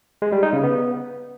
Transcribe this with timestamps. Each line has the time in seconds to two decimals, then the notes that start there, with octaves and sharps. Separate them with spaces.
0.22 G#3
0.32 G3
0.43 D#4
0.53 C#3
0.63 B3